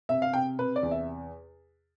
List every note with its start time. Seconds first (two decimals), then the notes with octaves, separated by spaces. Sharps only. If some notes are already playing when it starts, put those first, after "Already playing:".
0.09 C3 E5
0.22 F5
0.34 C3 G5
0.59 C3 B4
0.76 D5
0.83 E2
0.91 E5